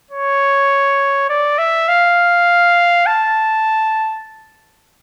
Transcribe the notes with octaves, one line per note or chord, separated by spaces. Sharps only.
C#5
D5
E5
F5
A5